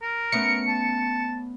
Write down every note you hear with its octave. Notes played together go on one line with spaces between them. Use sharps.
A#4
A3 B3 C#4 C#7
A5